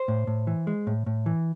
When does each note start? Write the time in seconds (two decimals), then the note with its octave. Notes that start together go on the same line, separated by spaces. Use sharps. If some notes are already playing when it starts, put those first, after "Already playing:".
Already playing: C5
0.08 A2
0.27 A2
0.47 E3
0.67 G#3
0.87 A2
1.06 A2
1.26 E3